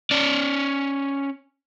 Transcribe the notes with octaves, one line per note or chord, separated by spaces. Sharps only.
C#4 D5